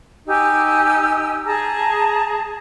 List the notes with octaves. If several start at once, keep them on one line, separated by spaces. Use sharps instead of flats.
D#4 G4 G#5 E6
G#4 A5 A#5